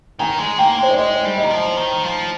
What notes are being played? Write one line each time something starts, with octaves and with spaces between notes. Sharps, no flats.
D#3 G#5
G#3
A#3 G5
G#3 C5
D5
G#3 D#5
G3
D#5
D#3
F3
D#3
F3